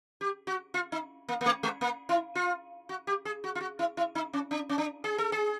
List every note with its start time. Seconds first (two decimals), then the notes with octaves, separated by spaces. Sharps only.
0.21 G4
0.47 F#4
0.74 F4
0.92 D#4
1.29 A#3
1.41 A#3
1.46 A3
1.63 G#3
1.81 A#3
2.09 E4
2.35 F4
2.89 F#4
3.07 G4
3.25 G#4
3.44 F#4
3.55 F4
3.60 F#4
3.79 E4
3.97 E4
4.15 D#4
4.33 C#4
4.51 D4
4.69 C#4
4.78 D4
5.04 G#4
5.18 A4
5.32 G#4